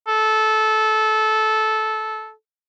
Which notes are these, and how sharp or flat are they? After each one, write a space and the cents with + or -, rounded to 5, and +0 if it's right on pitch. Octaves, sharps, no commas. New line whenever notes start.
A4 -15